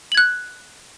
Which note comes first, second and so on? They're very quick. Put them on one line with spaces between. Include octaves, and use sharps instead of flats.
F#7 G#6 F#6